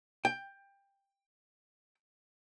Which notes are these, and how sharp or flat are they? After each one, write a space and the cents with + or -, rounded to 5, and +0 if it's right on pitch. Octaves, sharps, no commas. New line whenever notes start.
G5 +15